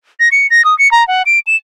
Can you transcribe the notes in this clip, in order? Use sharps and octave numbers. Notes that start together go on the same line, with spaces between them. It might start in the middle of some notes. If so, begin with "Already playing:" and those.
A#6
C#7
A#6
D#6
C#7
A#5
F#5
D7
E7